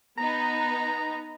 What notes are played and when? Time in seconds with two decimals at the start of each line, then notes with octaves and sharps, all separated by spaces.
0.18 B3 D#4 A#5